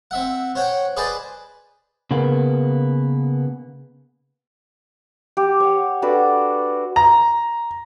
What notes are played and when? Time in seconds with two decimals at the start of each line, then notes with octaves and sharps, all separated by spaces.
0.11 C4 E5 F#5
0.55 C5 C#5 F#5 G5
0.97 G#4 B4 C5 D5 D#5 A5
2.11 C#3 A#3 B3
5.37 G4
5.60 C#5 F#5
6.02 D4 F#4 A4 B4
6.96 A#5